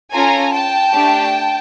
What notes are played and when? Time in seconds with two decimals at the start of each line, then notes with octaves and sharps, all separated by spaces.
0.12 C#4 F4 A4 G#5 A#5
0.53 G5 A5
0.93 A3 D4 G4